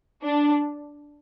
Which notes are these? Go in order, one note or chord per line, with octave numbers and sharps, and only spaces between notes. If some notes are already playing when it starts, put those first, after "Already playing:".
D4